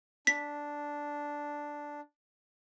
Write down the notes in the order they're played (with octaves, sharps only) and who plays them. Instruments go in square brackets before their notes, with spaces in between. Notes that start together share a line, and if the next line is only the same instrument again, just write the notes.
[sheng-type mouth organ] D4 [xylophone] B6